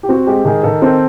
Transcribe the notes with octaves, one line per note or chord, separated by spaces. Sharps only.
G4
C4 F#4
G#3 G4
D#3 G#4
D#3 A4
C4 A4